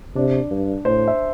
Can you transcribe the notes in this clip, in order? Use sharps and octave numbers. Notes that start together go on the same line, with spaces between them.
C3 D4
G2
A2 C5
E5